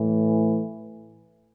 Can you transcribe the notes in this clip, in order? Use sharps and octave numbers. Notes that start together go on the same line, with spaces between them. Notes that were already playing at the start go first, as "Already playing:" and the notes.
Already playing: A2 E3